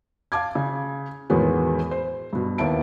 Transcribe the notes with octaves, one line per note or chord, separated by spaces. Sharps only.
F5 A5 D6 G#6
C#3
E2 A2 D#3 F#3 G#3 B3
C5
G2 B2
D#2 D#3 B3 E4 A5 D7